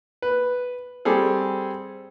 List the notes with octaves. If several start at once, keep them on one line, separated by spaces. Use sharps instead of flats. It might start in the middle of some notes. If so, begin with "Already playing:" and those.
B4
G3 C4 G#4 A4